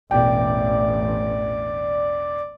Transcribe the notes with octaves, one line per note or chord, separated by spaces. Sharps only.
E1 A1 D5 G5